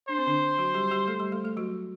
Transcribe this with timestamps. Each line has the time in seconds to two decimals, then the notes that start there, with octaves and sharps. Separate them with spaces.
0.08 D4 C5
0.18 C4
0.27 D3 D4
0.58 F#3 F#4
0.74 G3 G4
0.91 G3 G4
1.07 A3 A4
1.20 G3 G4
1.32 A3 A4
1.45 A3 A4
1.57 F#3 F#4